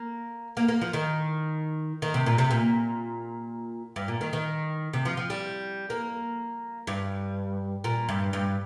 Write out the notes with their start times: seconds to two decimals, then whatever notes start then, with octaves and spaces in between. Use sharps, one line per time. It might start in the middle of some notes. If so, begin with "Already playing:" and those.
Already playing: A#3
0.57 A#3
0.68 A#3
0.81 F3
0.93 D#3
2.02 D#3
2.14 C3
2.26 A#2
2.38 C3
2.51 A#2
3.96 G2
4.08 A#2
4.21 D#3
4.33 D#3
4.93 C3
5.05 F3
5.17 F3
5.30 G3
5.90 A#3
6.87 G2
7.84 A#2
8.09 G2
8.33 G2